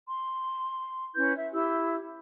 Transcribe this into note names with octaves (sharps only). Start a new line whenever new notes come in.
C6
C#4 E4 B4 G6
E5
E4 G4 E6